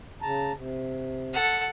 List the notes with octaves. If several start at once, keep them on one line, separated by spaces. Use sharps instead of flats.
C#3 A5 A#5
C3
A4 F#5